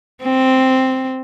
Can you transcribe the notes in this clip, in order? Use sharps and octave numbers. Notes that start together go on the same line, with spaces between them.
C4